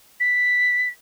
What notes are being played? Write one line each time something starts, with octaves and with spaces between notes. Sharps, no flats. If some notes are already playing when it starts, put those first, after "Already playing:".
B6